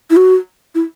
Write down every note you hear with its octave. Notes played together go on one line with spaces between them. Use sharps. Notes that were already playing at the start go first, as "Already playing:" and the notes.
E4
F#4
E4